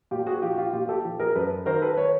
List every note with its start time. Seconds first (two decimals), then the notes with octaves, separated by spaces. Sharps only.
0.11 A#2 F4 G4
0.27 F#4 G#4
0.42 F3 F4 G4
0.53 F#4
0.58 F4 G4
0.73 A#2 F4 G4
0.89 G4 A4
1.05 F3
1.20 G#4 A#4
1.35 F#2 A4 B4
1.66 D#3 A#4 C5
1.82 A4 B4
1.97 B4 C#5